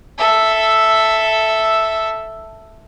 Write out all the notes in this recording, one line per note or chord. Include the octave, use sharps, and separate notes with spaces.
A4 E5